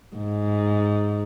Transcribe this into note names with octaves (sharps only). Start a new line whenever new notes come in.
G#2